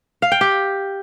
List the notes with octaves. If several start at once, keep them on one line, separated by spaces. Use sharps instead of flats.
F5
G5
G4